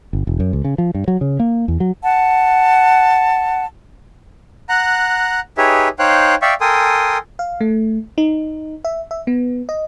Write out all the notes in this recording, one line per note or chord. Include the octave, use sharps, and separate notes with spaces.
G1
E1
F#2
C#2
C#3
F3
G2
F#3
C#3
A#3
E2
F#3
F#5 A5
F#5 A#5 F#6
D#4 G4 G#4 B4 C#5 E5
D#4 C5 C#5 F5 G5 F#6
D5 E5 F5 G5 C#6
A4 A#4 G5 G#5 C6 D#6
F5
A3
D#4
E5
E5
B3
D#5